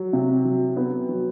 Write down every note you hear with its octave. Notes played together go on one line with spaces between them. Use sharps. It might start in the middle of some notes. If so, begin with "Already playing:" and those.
Already playing: F#3
C3
F#3
B3
F#3